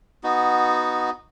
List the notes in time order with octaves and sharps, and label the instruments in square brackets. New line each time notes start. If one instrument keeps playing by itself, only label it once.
[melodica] B3 D#4 F#4